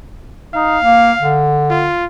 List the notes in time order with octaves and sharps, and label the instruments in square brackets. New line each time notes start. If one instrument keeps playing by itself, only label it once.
[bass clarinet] D#4 [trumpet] F5
[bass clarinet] A#3
D3
[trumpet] F4